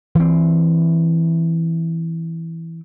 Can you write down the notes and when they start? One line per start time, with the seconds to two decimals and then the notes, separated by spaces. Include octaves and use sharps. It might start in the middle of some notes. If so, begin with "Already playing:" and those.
0.15 E3 C4